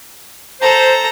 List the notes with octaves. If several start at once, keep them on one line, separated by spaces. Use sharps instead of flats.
A4 C5 A#5